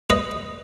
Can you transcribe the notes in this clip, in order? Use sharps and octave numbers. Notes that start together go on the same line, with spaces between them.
B4 D#5